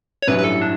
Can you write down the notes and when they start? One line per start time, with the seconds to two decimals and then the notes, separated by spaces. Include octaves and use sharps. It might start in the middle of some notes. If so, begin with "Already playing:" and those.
0.22 C#5
0.27 A1 G2 F#3 C#4 E4 B4
0.39 B4
0.44 A4
0.62 D4